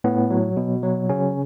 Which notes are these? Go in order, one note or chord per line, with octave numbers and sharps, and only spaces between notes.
A2 B3
F#3
B2
F#3
C#3 C#4